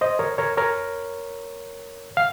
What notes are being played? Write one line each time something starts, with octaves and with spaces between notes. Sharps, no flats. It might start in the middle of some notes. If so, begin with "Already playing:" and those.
C5 D#5
A#4 C#5
A#4 C#5
A#4 C#5
F5